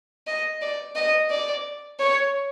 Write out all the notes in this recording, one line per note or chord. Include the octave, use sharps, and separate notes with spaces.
D#5
D5
D#5
D5
C#5